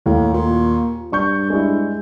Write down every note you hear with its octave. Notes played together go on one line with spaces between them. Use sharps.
D#2 A2
A#2
G2 D5 C#6 G6
G#3 D4 E4